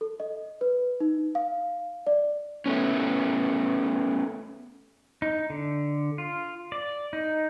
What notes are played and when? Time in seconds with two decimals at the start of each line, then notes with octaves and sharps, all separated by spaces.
0.01 A4
0.20 D#5
0.61 B4
1.00 D#4
1.35 F5
2.07 D5
2.66 A3 B3 C#4
5.22 D#4
5.50 D3
6.18 F4
6.72 D5
7.13 D#4